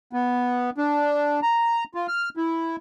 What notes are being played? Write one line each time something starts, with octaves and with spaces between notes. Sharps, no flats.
B3
D4
A#5
F4
F6
E4